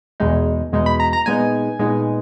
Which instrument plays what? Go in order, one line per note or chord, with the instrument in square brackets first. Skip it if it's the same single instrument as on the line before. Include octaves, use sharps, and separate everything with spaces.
[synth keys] E2 B2 G#3 D#4
E2 B2 G#3 D#4
B5
A#5
A#5
A#2 G#3 B3 D#4 G#5
A#2 G#3 B3 D#4